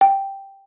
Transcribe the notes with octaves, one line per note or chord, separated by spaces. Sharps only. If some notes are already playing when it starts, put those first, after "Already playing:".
G5